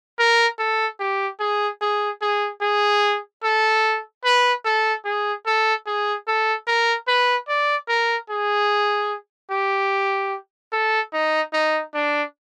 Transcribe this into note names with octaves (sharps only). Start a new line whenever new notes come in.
A#4
A4
G4
G#4
G#4
G#4
G#4
A4
B4
A4
G#4
A4
G#4
A4
A#4
B4
D5
A#4
G#4
G4
A4
D#4
D#4
D4